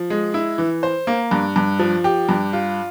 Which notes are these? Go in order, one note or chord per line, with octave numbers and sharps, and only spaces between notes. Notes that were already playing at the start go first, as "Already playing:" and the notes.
Already playing: F3
G#3
E4
E3
C5
A#3
G2
G2
F3
G4
G2
F4